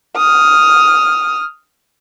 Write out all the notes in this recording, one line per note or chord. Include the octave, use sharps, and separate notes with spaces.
D#6 F6